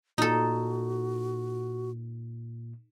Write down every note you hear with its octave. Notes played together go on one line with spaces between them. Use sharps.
A#2 D#4 F#4 A4